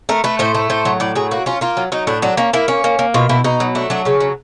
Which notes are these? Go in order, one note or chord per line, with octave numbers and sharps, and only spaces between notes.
A3 A#4
A3 B4
A2 C5
A3
A2 C5
F#3
A2 D5
F#3 G#4
A#3 F#4
C#4 F4
A#3 F4
F#3
F#3 D#4
A2 D4
F#3 D4
A#3 C#4
A#3 E4
C#4
A#3
A#3
B2 F4
B2 E4
B2 D#4
F#3
A3 D4
F#3 D4
C#3 C#4
F#3